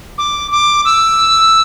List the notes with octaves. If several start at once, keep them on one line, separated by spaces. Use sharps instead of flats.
D6
D6
E6